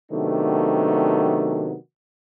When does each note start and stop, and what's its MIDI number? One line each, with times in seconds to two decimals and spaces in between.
0.11 1.75 48
0.11 1.75 51
0.11 1.75 54
0.11 1.75 57
0.11 1.75 59
0.11 1.75 62